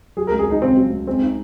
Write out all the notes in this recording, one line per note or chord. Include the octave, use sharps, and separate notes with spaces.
F#3 G#4
A#4
C#2
G#4
C#2 D#4
C#3 C4
F#3
C#2
G#3 C4
D#4